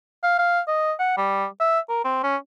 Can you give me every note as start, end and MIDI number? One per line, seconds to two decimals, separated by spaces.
0.23 0.37 77
0.39 0.60 77
0.68 0.92 75
0.99 1.15 78
1.17 1.45 55
1.60 1.79 76
1.89 2.03 70
2.04 2.22 60
2.23 2.36 61